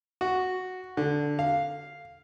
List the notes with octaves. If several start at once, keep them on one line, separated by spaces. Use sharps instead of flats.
F#4
D3
F5